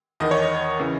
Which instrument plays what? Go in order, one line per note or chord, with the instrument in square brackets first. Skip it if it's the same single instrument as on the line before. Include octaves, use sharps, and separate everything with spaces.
[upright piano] E2 D#3 D#5
C#5
D#5
C#3 E3